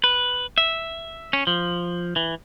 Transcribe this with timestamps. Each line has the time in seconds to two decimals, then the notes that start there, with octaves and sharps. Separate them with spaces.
0.04 B4
0.58 E5
1.33 C#4
1.47 F3
2.16 E3